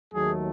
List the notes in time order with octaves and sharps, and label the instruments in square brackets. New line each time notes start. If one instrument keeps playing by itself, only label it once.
[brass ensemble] D#2 D#3 F#3 A3 G#4